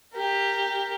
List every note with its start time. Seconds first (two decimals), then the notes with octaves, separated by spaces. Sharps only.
0.13 G4 A#4